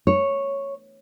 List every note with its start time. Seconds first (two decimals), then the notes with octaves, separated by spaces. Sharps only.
0.07 C#5